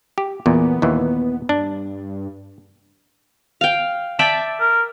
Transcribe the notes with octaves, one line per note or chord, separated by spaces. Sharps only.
G4
E2 A#2 B3
D#2 A#2 E3
G2 D4
F5 G5
D5 E5 G5 A5
A#4